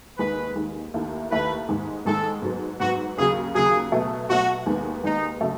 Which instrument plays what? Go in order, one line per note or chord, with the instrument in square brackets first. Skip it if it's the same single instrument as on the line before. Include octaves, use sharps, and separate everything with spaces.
[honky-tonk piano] D#2 D#3 G#3 D#4 [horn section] B4
[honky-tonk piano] D#2 D#3 G#3 D#4
D#2 D#3 A3 E4
[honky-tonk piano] D#2 D#3 A3 E4 [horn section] B4
[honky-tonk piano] G#2 D#3 G#3 D#4
[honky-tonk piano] G#2 D#3 G#3 D#4 [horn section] A4
[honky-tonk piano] G#2 F#3 B3
[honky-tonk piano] G#2 F#3 B3 [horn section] F#4
[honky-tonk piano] D#2 C#3 F#3 [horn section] G#4
[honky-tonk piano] D#2 C#3 F#3 [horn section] G#4
[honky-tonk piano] B2 F#3 A3
[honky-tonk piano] B2 F#3 A3 [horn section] F#4
[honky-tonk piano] D#2 D#3 G#3 B3
[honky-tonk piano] D#2 D#3 G#3 B3 [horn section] D#4
[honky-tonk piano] C#3 F#3 A3